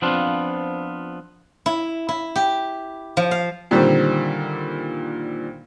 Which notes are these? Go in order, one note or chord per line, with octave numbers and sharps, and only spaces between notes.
F3 B3 C4 D4 F4
E4
E4
G4
F3
F5
A#2 D3 D#3 G3 C4